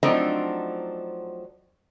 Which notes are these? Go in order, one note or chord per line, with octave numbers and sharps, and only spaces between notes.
F3 F#3 A3 C4 D4 D#4